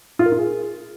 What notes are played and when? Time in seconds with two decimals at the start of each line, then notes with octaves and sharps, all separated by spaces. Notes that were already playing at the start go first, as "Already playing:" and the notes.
0.19 F4
0.26 A#4
0.32 F4
0.39 G#4